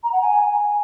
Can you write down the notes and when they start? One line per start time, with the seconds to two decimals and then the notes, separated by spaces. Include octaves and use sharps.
0.04 A#5
0.13 F#5
0.22 G#5